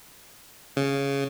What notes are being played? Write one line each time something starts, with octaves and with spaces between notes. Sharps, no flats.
C#3